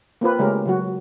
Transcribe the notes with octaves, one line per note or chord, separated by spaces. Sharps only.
A#3 C4 F4 B4
C#3 G#3 A3 C#4 G4 A#4
C#3 F#3 F#4